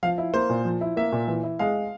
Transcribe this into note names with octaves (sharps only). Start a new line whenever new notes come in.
F3 F5
E4
A#3 C5
A#2
F3
E4
A#3 E5
A#2
E3
E4
G#3 F5